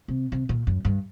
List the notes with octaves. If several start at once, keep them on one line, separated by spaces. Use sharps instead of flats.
C3
C3
A#2
F#2
G2